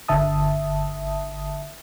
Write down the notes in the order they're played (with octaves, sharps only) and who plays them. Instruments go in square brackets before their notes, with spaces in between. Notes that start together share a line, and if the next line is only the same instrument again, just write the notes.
[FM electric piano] G1 D3 E5 A5 D#6